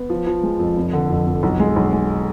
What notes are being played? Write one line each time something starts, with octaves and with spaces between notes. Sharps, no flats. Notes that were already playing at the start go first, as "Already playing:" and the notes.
Already playing: B3
F3
F3
G#3
F2
F1
D3
F2
F2
B1
G#3
B1
G#3